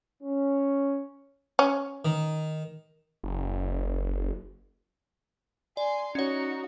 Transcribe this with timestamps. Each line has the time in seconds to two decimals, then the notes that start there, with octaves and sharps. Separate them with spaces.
0.23 C#4
1.59 C#4
2.05 D#3
3.24 F#1
5.77 D5 G#5 C6
6.15 C#4 D#4 F#4 C#5